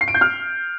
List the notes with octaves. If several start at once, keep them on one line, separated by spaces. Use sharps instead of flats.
C7
D7
G6
F6